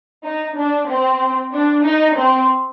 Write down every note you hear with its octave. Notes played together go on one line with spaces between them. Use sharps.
D#4
D4
C4
D4
D#4
C4